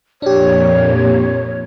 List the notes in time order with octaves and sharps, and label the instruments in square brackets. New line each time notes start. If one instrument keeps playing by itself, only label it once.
[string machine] F2 A#2 [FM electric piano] D4 G4 [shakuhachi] C#5